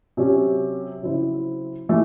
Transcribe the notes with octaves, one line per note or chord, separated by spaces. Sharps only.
C3 F#3 C#4
C#3 F#3 C4 E4 C5
E3 A3